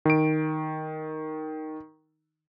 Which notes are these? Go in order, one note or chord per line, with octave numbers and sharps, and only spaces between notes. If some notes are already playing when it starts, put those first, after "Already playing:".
D#3 D7